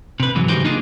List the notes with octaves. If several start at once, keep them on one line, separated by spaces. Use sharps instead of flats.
C3 B4
G#2 E3 F#3
A2 C#3 D#4 F#4 G4 C5
A#3 D4 D#4 F4 G#4